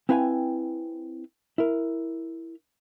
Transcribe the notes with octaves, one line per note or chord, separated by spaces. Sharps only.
C4 E4 B4 F5 G5 G#5
E4 A#4